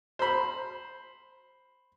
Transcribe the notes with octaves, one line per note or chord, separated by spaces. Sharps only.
C5 B5